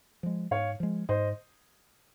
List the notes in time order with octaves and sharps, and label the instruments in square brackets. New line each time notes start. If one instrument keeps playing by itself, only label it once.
[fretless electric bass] F3 G#3
[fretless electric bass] G#2 [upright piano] C#5 F5
[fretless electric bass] F3 G#3
[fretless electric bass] G#2 [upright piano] C5 D#5